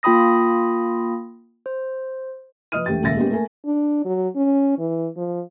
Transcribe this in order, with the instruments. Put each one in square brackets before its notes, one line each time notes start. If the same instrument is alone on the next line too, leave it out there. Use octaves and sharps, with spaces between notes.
[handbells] A#3 F4 G5 B5 D#6 A#6
C5
[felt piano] F3 B4 D#5 D#6 F6 D#7
E1 A3 G4 G5 A6
D#1 C#2 A#2 E5 A6 A#6
G#3 A#3 B3 C#4 G4
A3 A#3 A4 A#4 G#5
[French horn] D4
F#3
C#4
E3
F3